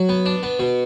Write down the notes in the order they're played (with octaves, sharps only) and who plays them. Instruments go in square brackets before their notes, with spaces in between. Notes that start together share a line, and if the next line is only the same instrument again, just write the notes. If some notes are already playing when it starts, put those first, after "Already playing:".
Already playing: [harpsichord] F#3
B3
D4
B3
B2